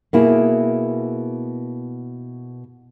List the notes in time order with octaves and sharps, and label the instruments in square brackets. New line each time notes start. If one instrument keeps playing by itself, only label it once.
[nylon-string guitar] B2 A#3 E4 G#4